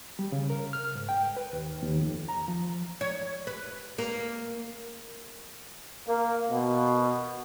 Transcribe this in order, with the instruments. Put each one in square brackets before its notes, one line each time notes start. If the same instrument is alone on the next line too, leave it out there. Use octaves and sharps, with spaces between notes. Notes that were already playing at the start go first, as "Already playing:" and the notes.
[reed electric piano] G3
C#3
A#4
F6
G#2
G5
B4
D#2
D#2
F2
A#5
F3
[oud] C#5
B4
A#3
[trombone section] A#3
B2